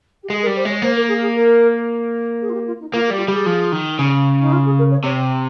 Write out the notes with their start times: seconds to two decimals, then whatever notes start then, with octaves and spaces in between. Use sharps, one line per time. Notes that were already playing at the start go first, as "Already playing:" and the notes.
0.23 G4
0.29 G#3 G#4
0.42 A#4
0.47 G3
0.56 C5
0.65 G#3 C#5
0.82 A#3 C5
0.96 A#4
1.08 G#4
1.22 G#4
1.35 A#4
2.41 G#4
2.49 F4
2.54 G4
2.66 F4
2.80 D#4
2.93 A#3 F4
3.07 G4
3.10 G3
3.16 F4
3.25 G4
3.28 G3 G#4
3.46 F3
3.72 D#3
3.99 C#3
4.40 D#4
4.52 F4
4.65 G#4
4.78 A#4
4.91 C#5
5.04 C3 C#5